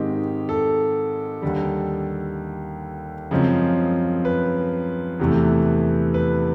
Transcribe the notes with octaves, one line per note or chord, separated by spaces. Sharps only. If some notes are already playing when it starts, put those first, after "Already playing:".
Already playing: G#2 D#3 G#3 C4 G4
A4
D#2 D3 G3
F#2 C#3 F3 G#3 C4
B4
E2 C3 E3 A3
B4